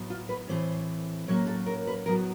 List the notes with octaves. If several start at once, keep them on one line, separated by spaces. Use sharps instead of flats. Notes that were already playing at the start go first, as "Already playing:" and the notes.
Already playing: A2 F#3 B3
F4
B4
A2 E3 A3 C4 C5
A2 F#3 A#3 C#4 C#5
A4
A#4
B4
A2 F#3 B3 A#4